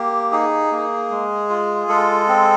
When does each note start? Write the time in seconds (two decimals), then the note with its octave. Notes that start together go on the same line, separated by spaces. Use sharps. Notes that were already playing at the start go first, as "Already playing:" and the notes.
Already playing: A#3 G4
0.32 D#4 G#4
0.71 A#3
1.10 G#3
1.50 F4
1.89 G#3 A4
2.28 C4